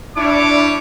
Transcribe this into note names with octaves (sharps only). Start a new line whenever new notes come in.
G3 D4 E4 C#5 D6